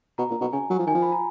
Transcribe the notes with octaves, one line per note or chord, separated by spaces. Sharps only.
B2 A#5
A#2
B2
C#3 G#5
F#3
F3
D#3 G#5
F3
B5
A#5